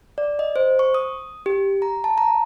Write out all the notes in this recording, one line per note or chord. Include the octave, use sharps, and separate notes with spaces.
D5
D#5
C5
C#6
D#6
G4
A#5
A5
A#5